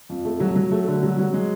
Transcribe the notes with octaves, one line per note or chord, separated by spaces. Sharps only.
F2
A3
F#3
F#3
A3
D3
F#3
F#3
G#3